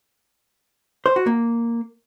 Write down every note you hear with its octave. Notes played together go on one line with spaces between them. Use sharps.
C5
F#4
A#3